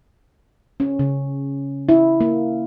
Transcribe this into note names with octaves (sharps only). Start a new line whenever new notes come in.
C#4
C#3
E4
A#3